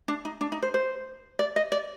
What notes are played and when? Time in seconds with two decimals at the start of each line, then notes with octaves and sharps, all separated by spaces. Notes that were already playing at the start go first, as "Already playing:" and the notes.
0.08 D4
0.25 D#4
0.41 D4
0.52 D#4
0.62 C5
0.74 C5
1.39 D5
1.56 D#5
1.72 D5